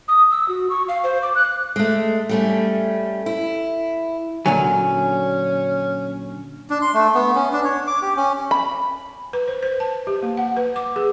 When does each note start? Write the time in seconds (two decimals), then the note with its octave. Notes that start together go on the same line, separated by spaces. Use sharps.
0.08 D#6
0.31 E6
0.49 F#4
0.70 C#6
0.88 F5
1.04 C5
1.23 D6
1.35 F#6
1.76 G#3 A3
2.29 G3 A3 C#4
3.26 E4
4.46 A#2 D3 F#3 C#4 G#5
6.70 D4
6.82 C6
6.94 A3
7.15 B3
7.35 C#4
7.53 D4
7.64 C#5
7.87 D6
8.02 G4
8.17 C#4
8.51 B5
9.33 B4
9.48 C5
9.63 C5
9.80 A5
10.07 G4
10.23 A#3
10.37 F#5
10.57 B4
10.76 D6
10.96 G#4